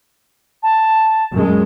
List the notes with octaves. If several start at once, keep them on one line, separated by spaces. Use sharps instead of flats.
A5
F#2 G#3